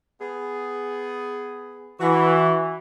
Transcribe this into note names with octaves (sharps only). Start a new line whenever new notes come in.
B3 G#4
E3 F#4